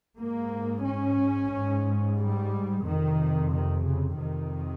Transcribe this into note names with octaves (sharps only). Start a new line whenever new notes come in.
G#2 A#3
C#4
G#2
G3
F2 C3 D#3
D#3
C#3
F2 C3 D#3